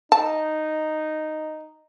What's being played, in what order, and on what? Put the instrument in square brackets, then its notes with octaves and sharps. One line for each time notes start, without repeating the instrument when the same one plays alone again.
[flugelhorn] D#4 [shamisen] A5